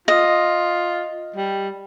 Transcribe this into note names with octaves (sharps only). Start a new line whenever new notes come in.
F4 D#5
G3